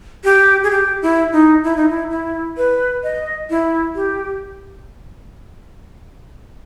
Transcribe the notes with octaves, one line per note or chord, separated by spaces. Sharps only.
G4
G#4
G4
E4
D#4
E4
D#4
E4
E4
B4
D#5
E4
G4